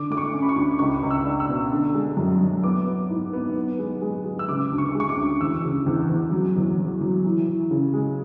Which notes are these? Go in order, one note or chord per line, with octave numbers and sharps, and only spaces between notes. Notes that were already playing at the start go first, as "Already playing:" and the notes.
Already playing: D3 D6
A3 D6
C#6
C#4
B5
C#6
D2
C#2 C#6
C#2
E6
D4
E6
B2
D3
G#3
F#2
F#2
B3 D6
B3
G#2
B3
B3
G#3
G#3
G#3
E6
C#3 D6
D2
C#6
G#3
C#6
D6
D2
E2 E6
C#3
E2
E2
F#3
E2
F#3
F#3
E3
E3
C#3
G#3